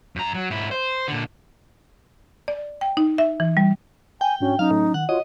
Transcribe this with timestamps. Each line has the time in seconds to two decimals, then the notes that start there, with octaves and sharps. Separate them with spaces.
0.16 F#2 A#5
0.34 F#3
0.50 G#2 E4
0.71 C5
1.08 A#2 D3
2.48 D5
2.81 G5
2.97 D#4
3.18 E5
3.40 E3
3.57 G3
4.21 G5 G#5
4.41 G#2 C#4 D4 F#4
4.59 F#3 C#4 D#4 F5
4.71 A2
4.94 D#3 F#5
5.09 F4 F#4 C#5 D#5 F#5